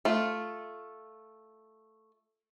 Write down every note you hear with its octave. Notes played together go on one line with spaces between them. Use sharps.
A3 F4